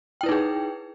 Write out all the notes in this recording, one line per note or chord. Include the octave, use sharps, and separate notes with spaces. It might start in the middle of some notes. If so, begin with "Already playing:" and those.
D#4 E4 G#4 B4 G5